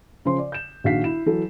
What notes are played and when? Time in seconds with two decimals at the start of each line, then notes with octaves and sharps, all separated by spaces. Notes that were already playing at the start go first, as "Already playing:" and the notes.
0.25 C#3 F3 C5 C6
0.38 D5
0.52 G6 E7
0.84 A#1 D#3 F#4 F5 B6 C7
1.04 E4 E7
1.26 E3 F#3 A4